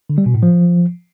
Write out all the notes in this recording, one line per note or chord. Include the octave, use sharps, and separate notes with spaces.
D3
G3
B2
A2
F3